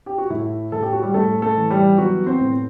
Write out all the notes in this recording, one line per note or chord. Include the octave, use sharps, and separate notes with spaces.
G4
F#4
A2 E4
A2 A4
G4
F#4
G3 G4
A2 A3 A4
A3 A4
E3
G3 G4
F#3 B3 F#4
C4 C5
A2